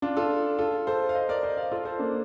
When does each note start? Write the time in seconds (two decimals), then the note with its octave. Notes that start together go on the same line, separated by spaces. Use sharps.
0.02 D4 F4
0.17 F4 A4
0.59 F4 A4
0.87 A4 C5
1.09 F5
1.15 C5 D#5
1.29 A#4 D5
1.43 C5 D#5
1.57 D5 F5
1.72 F4 A4
1.85 A4 C5
1.99 A#3 D4